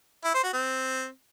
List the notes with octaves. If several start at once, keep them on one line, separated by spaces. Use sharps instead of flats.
E4
C5
F#4
C4